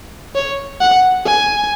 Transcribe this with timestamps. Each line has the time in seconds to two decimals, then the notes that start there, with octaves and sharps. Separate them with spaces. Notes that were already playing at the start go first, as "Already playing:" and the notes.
0.35 C#5
0.80 F#5
1.26 G#5